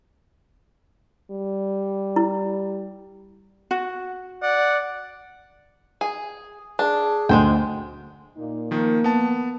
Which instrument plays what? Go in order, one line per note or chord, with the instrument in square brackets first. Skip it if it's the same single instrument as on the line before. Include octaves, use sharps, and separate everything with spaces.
[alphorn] G3
[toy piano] E4
[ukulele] F#4
[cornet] D5 [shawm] F#5
[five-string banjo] G#4
[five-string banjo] D4 [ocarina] G#4
[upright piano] D2 [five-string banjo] G#3 C5 G5
[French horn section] A#2 A#3 D#4
[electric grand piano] D#3 F3 [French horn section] A#3
[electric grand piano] B3 A5